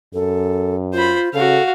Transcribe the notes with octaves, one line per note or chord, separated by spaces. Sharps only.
F#2 A4
F4 C5 B5
C#3 F#4 A4 F5